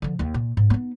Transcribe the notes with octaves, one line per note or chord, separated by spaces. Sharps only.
D3 F3
D#2 D#3
A#2
G#2
B3 D#4